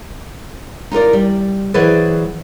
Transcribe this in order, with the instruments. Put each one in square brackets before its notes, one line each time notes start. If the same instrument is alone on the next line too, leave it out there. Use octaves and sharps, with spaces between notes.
[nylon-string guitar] D#4 F4 A#4 D5
G3
E3 F#3 G#4 B4 C5 D5